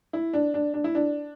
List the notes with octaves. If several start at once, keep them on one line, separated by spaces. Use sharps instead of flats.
E4
D4
D4
D4
E4
D4